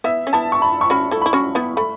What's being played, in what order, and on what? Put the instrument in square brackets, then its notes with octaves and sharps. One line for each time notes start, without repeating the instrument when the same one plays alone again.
[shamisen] B3 E4 [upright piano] E5
[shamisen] C#4
[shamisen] B3 E4 [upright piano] A5
[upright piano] C#6
B5
C#6
[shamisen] C#4 F#4 [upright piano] B5
[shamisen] E4 A4
[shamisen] E4 [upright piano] B5
[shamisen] C#4 F#4 [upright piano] C#6
[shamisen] B3 E4
[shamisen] A3 [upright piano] B5